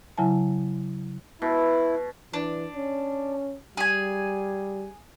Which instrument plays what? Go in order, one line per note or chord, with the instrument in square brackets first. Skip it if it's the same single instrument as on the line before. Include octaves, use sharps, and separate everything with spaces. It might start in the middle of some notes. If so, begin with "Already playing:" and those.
[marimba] C#3 F#3 E4 E5 G#5 A5
[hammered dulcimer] B2 [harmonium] E4
[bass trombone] E3 [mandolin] D4
[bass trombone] C#4
[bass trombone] G3 [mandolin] G#4 G#5